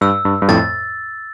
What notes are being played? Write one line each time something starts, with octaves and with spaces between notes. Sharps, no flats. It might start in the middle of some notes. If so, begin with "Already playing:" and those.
G2 E6
G2
G2
F2 A2 A6